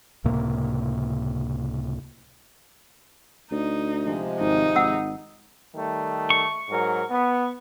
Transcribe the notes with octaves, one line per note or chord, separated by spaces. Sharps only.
C#2 A2 C3 A#3
D2 D#4
C3 F3 G#3
G#1 D#4
G#1 F#5 D#6 E6
D#3 G3 A3
C#6
G#2 F#3 A#4
B3